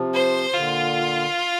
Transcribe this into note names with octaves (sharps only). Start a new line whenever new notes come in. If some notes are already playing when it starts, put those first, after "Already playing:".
Already playing: C3 F3
C5
A#2 D3 F4